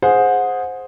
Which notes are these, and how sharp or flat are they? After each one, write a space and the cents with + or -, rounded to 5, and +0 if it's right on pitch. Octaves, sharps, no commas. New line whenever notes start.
G#4 +0 C5 +0 F#5 -25